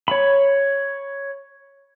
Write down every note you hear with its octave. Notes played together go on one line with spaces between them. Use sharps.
C#5 B5